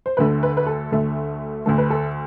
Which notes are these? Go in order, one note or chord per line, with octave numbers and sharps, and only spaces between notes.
C5
D2 D3 A3 B4
B4
B4
A4
D2 D3 A3
D2 D3 A3 A4
B4
A4